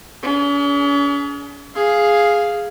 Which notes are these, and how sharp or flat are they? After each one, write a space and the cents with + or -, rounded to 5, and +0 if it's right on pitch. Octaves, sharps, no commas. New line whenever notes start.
C#4 +45 G#4 +25
G#4 +0 F5 +0